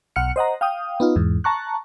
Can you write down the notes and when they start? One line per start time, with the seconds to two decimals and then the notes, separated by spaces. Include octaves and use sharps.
0.16 B1 F#5 F6 C#7
0.36 C5 D#5 F#5 A#5
0.61 F5 G5 D#6
1.00 B3 D#4 F4
1.16 E2 G#2
1.44 A5 A#5 C#6 F#6